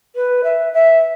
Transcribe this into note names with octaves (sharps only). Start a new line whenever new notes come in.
B4
E5
E5